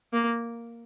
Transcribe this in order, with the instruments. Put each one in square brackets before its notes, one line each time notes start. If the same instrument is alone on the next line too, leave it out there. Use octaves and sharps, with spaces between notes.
[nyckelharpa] A#3